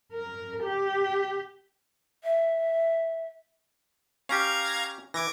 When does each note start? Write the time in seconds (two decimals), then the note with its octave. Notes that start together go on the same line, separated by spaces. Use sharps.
0.13 A#4
0.63 G4
2.24 E5
4.29 C#4 G4 F5 A#5 G#6
5.14 E3 D6 G#6 A#6